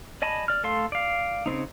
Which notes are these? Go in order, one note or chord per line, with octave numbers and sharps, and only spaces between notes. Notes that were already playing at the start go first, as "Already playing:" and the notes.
D5 D#5 G#5 A5 B5
D5 F6
A3 A4 F5 C6
D5 F5
C#3 A3 C4 D#4